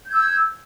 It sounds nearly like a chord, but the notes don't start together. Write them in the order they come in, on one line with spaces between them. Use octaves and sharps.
G6 G#6 E6